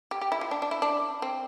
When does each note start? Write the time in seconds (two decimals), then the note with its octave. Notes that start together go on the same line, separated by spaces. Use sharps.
0.11 G4
0.21 G4
0.32 E4
0.41 F4
0.51 D4
0.62 D4
0.71 E4
0.82 D4
1.22 C4